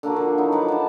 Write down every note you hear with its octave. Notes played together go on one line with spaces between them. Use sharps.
D3 A#3 D4 F#4
F3
F#3 D#4 E4
F3 B4 F#5 D6
D4 A5